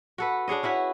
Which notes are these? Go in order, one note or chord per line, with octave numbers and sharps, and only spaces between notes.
F#4 A4 B4
D4 G#4 C#5 D#5
C#4 E4 F#4 B4